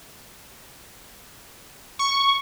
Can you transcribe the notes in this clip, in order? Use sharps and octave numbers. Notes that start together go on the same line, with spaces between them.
C#6